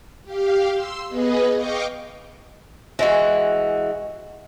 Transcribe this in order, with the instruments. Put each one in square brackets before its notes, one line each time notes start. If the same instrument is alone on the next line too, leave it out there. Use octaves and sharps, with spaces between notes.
[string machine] G4 F5
C6 E6
B3 G#4 B4 D#5
D#5 F5 G5 C#6 D6
[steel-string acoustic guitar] E3 G#3 F#4